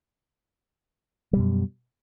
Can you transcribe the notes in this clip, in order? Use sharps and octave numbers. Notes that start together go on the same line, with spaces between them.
F#2 B2 G3